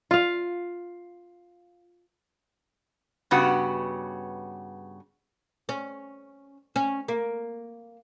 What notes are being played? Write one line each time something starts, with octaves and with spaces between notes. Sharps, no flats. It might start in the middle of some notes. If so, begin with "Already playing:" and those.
F4 F5
G2 C#3 B3 F#4 G4
C#4
C#4
A#3